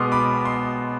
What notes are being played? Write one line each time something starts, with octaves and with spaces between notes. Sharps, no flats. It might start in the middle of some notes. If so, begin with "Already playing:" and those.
Already playing: B2 G#3 B3 C6 D6 D#6 F6
B5 D6
C6